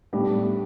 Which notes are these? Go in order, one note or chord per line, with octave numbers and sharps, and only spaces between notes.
A2 G3 B3 D4 G4